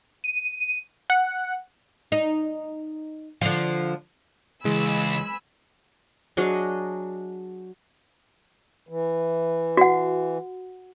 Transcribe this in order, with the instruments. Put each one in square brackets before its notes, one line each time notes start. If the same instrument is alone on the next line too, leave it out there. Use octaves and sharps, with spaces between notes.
[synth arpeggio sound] D#7
F#5
[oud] D#4
D3 F3
[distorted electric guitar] C#2 [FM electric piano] E3 [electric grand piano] G#3 [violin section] G#5 B5 E6
[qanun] F#3 D4 G#4 D#5
[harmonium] E3
[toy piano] F#4 F#5